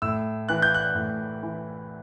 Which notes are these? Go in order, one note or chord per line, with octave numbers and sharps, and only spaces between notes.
A2 E6
E3 F#6
G6
F#6
A2
E3